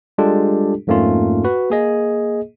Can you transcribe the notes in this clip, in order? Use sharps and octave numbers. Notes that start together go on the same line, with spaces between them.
G3 G#3 D4 F4 G4 A4
F2 G#2 A3 A#3 C#4 F4
F#4 B4
A#3 G#4 D#5